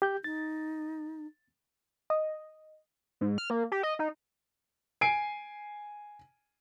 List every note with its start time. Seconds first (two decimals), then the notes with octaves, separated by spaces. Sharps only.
0.02 G4 G6
0.24 D#4 A6
2.10 D#5
3.21 G#2
3.38 F6
3.50 A#3
3.72 G4
3.83 D#5
3.99 D#4
5.01 G#5 C7 D7